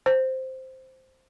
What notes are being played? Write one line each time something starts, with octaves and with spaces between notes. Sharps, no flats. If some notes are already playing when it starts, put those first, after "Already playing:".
C5